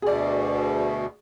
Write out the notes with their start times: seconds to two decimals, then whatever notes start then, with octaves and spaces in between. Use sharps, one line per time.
0.02 D2 B2 G#4 D5